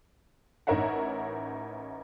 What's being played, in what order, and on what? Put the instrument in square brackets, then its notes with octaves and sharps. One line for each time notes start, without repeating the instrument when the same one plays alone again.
[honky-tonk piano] A1 D#4 A#4 C#5 E5 F#5